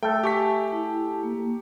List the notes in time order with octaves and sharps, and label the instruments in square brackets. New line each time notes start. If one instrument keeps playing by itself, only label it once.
[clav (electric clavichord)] A3 A4 [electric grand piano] G5
[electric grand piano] G4 C#6 B6 [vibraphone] G#5
[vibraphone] E4 A5
A#3